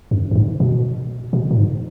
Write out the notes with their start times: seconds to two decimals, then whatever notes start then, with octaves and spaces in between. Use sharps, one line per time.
0.11 F#2
0.31 F#2
0.35 G#2
0.60 B2
1.33 B2
1.51 A#2
1.57 G#2